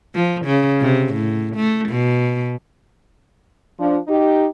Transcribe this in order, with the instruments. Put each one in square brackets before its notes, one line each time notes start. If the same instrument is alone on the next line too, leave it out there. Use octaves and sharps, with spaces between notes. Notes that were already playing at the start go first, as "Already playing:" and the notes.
[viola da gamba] F3
C#3
C3
A2
A3
B2
[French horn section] F3 D4
D#4 G4